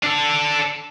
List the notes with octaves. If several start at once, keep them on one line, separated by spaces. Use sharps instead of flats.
D4 A4